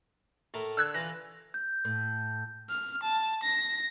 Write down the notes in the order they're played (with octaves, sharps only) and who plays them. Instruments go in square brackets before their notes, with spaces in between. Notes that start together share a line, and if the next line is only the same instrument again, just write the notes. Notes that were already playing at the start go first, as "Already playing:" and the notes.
[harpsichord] A2 A3 A#4
[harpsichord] D3 [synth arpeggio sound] E6 F#6 G#6
[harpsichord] E3 F4 [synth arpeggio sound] A#6
[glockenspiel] G6
[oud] A2
[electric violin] F6
A5
A#6